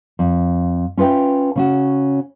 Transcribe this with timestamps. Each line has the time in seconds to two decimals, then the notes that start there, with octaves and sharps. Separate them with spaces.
0.19 F2
0.97 C#4 F4 B4 E5 G5
1.56 C#3 C#4 F#4